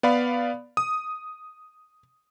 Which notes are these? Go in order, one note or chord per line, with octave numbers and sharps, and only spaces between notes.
B3 D5 F5 B5
D#6